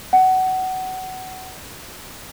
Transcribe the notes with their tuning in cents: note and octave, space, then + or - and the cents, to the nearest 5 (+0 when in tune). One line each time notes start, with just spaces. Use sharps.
F#5 +20